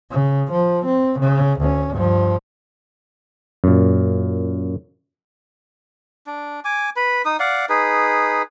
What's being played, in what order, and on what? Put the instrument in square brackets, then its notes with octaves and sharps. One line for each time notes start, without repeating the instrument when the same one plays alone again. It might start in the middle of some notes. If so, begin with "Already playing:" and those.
[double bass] C#3
F3
C4
C#3
D2 C#4
G2 F3
[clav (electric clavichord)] F#2 A#2
[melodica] D4
G#5 D6
B4 B5
D#4 D#6
D5 F5 F#5
D#4 G#4 B4